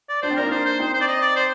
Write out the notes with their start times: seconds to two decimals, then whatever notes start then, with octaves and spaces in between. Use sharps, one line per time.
0.09 D5
0.22 D4 C5
0.31 C4
0.36 A#3 D4 A#4
0.46 D#4
0.51 A#3 D4 C5
0.65 C5
0.79 C4 D#4 C5
0.93 C5
1.01 D5
1.07 D#5
1.21 D5
1.36 C5